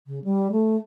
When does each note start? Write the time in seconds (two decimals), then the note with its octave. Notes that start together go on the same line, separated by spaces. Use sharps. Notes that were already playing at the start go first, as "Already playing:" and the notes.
0.07 C#3
0.24 G3
0.51 A3